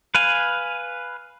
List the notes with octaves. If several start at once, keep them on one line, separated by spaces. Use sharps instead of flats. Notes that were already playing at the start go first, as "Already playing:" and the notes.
B4 F5 G#5